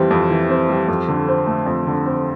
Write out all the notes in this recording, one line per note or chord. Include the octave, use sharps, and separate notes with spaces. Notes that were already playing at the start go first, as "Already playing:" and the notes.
Already playing: F2 E3 G3 C4
F2
E3
C4
G3
F2
D3
C4
A3
F2
D3
C4